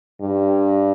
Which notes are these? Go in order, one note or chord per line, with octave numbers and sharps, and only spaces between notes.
G2